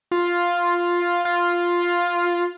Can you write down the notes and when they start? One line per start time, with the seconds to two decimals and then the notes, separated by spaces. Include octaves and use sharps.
0.11 F4
1.25 F4